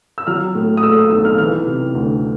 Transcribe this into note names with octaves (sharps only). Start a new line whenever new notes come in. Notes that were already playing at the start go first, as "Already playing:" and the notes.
E6
F#3 F6
A2
D#6
A3 E6
D#6
B1 E6
F6
E3 F6
C3
D2